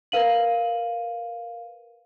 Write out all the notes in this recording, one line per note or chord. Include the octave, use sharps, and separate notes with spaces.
A#4 B4 F5 D#7 F#7